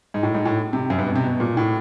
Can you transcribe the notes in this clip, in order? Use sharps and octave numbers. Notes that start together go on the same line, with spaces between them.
G#2
A2
G#2
A2
C3
F#2
G2
B2
C3
B2
A#2
A2